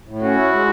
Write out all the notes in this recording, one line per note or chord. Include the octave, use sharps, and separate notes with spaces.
A2
C#4 F#4
E4
G#3